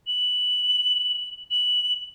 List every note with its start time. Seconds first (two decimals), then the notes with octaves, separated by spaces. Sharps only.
0.07 F#7
1.51 F#7